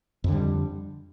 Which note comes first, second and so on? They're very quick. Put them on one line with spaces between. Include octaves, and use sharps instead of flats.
F2 D3 G3